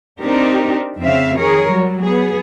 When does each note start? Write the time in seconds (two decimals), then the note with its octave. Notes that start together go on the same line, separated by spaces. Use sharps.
0.22 C4 D4 D#4 G4 A#4
0.99 F2 C#3 C4 E5 F5
1.38 D#3 G#4 A#4 C#5
1.71 F#3 G3
2.03 B3 G#4